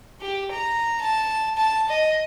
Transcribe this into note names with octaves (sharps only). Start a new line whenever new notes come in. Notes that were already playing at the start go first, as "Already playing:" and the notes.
G4
A#5
A5
A5
D#5